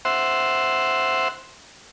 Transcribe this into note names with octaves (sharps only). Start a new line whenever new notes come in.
C5 E5 F#5 C6